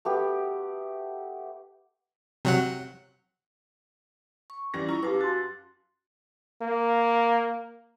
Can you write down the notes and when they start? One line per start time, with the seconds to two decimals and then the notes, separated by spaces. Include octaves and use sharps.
0.05 A3 B3 G4
2.45 C3 F#3 F#5
4.50 C#6
4.74 E3 G3 C#4 A#6
4.89 E4 F4 A#5 C#6
5.03 F#2 G4 B4 F5 A5 D6
5.21 F#4 C6 A6
6.61 A#3